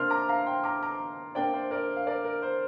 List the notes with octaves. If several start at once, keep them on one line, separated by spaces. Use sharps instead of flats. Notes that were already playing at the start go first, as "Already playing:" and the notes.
Already playing: C3 A#3 D4 C6 F6
A#5 D6
F5 A#5
G5 C6
A#5 D6
A#5 D6
C3 A#3 D4 D5 G5
C5
A#4 D5
F5
A#4 D5
A#4
C5